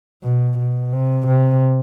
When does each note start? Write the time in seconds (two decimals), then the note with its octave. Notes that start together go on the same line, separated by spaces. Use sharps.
0.24 B2
0.59 B2
0.93 C3
1.27 C3